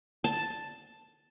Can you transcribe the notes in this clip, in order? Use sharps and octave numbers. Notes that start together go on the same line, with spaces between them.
A5